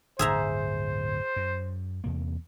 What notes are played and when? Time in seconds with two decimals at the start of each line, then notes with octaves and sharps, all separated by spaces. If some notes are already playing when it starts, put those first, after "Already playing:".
0.19 D1 G1 G#4 C5 E5 A#5
1.36 F#2
2.04 E2 C3 A#3